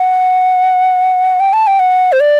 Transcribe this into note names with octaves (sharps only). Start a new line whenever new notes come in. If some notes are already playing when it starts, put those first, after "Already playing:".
Already playing: F#5
G5
A5
G5
F#5
C5
D5